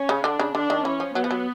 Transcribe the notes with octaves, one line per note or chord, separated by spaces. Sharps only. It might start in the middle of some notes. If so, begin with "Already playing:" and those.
Already playing: C#4
C#3
D3 D4
C#3
D3 D4
D#3
E3 C#4
F3
F#3 B3
F3
F#3